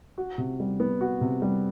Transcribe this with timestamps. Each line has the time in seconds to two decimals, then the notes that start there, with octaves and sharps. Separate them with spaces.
0.18 F#4
0.38 C3
0.60 G3
0.80 B3
1.01 F#4
1.21 C3
1.42 G3